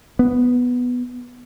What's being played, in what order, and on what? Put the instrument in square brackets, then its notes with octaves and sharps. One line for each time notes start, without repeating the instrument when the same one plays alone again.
[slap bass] B3